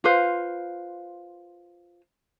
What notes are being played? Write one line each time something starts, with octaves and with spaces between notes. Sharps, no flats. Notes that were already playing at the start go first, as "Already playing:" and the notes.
F4 B4 C5 F5